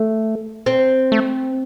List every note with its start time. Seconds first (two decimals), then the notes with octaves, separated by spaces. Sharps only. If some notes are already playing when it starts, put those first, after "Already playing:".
Already playing: A3
0.66 C4
1.12 A3